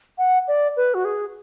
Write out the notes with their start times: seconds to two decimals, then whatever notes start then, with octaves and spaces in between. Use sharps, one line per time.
0.18 F#5
0.48 D5
0.77 B4
0.94 F#4
1.05 G#4